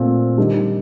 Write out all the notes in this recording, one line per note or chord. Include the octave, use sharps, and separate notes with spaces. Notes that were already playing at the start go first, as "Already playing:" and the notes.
Already playing: A#2 A3 C4
D#3 G3 D4 G4